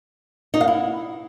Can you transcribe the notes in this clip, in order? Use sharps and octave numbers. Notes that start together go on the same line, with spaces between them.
D#4
F5
E4